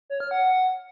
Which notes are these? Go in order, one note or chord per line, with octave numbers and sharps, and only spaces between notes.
C#5
F6
F#5